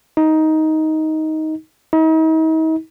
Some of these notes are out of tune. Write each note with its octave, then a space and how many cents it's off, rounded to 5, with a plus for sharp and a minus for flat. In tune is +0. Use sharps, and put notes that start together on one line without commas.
D#4 +10
D#4 +40